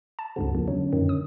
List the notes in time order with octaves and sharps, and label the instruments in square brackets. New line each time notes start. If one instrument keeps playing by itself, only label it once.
[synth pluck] A5
[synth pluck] C#2 G2 C#3 [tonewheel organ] C4 F#4 A4
[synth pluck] E2 [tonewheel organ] C#3 F3 A#3
[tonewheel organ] D3 C#4 [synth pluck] F#3
[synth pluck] F#2 A#2 D#3
D#6